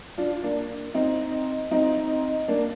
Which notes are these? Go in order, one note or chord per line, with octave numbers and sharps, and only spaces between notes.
D4 F4
A#3 D4
C4 D#4
C4 D#4
A#3 D4